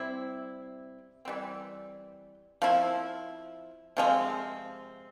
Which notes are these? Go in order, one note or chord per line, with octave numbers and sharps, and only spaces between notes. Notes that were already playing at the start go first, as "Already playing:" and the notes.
Already playing: C3 G3 C4 E4
E3 G3 C4
F3 C4 E4
C3 F3 G#3 C4